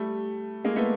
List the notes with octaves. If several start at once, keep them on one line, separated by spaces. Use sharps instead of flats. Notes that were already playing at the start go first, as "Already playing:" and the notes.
Already playing: G3 A3
G#3 A#3
A3 B3